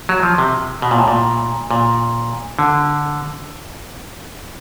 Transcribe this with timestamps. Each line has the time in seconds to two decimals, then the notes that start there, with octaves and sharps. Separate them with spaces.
0.09 F#3
0.23 F3
0.38 C3
0.82 B2
0.91 A#2
0.98 A2
1.08 A#2
1.71 A#2
2.59 D3